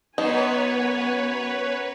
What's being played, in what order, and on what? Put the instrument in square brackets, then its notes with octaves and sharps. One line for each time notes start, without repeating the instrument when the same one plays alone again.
[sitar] F#2 [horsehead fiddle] B3 G#5 [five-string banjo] D#4 [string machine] B4 C#5